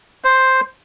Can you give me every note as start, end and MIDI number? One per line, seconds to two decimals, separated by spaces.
0.24 0.61 72